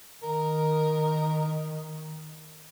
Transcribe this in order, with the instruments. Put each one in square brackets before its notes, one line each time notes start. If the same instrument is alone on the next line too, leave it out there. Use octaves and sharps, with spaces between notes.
[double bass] D#3 [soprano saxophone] A#4